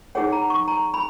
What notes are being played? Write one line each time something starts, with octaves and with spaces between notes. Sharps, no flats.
D#4 G#4 C#5 F#5
A#5
C#6
A#5
B5